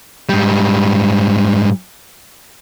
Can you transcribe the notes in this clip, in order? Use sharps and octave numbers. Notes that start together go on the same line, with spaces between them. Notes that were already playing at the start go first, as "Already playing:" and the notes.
G#2 G3